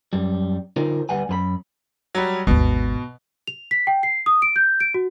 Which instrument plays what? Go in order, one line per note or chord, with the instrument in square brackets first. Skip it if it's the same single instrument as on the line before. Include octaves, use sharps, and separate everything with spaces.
[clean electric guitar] F#2 G3
D3 D#4 F4 A#4 C5
D2 G3 B4 F#5 G#5
F#2 B4 B5
[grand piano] F#3 G3
[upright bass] G#1 D#2 [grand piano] B2
[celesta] F7
B6
G5
C7
D#6
D7
G6
D7
F#4